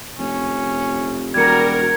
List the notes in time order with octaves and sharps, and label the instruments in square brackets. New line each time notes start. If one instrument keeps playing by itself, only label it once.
[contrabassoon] F1 [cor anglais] C#4
[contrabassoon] E1 [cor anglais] G3 [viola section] F#4 A#4 [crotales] G#6 C#7